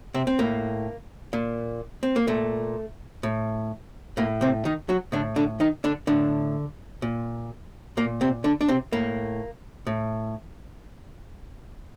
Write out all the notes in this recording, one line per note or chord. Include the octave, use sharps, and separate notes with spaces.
C3 C4
C4
A2 A#3
A#2
C4
A#3
A#2 A3
A2
A2 A#3
C3 C4
D#3 D#4
F#3 F#4
A2 D3 D4
D3 D4
D#3 D#4
D3 D4
A2 D3 D4
A#2
A#2 A#3
C3 C4
D3 D4
D4
C3 C4
A2 A#3
A2